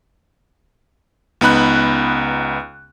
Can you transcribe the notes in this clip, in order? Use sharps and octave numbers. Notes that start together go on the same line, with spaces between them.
C#2 B3 D#4 B5 F#6